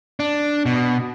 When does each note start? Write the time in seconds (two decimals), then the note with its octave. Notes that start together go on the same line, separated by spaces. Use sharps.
0.20 D4
0.66 B2